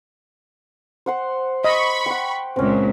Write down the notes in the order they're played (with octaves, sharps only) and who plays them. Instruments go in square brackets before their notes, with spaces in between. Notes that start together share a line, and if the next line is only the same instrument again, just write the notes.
[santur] C5 F#5 C6
[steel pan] D#5 [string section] B5 C#6
[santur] F#5 G5
[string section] C#2 A#2 [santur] C4 C#4